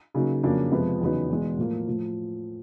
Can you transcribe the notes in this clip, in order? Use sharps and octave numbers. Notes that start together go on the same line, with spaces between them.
C#3 F#3 A#3 D#4
F2 C#3 F#3 A#3 D4
F2 C3 F3 G#3 B3
E2 C#3 F#3 B3 D#4
E2 B2 G#3
A2 F3 A#3
A2 F3